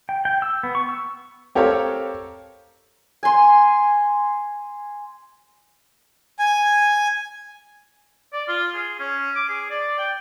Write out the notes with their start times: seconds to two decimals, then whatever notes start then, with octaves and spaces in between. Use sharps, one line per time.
0.09 G5
0.25 G5
0.42 E6
0.63 B3
0.75 C#6
0.89 E6
1.55 C4 G4 A4 A#4 C#5 F5
3.23 G#5 C6
6.39 G#5
8.33 D5
8.48 F4
8.74 G#4
8.99 C#4
9.35 D6
9.49 G#4
9.70 D5
9.98 G5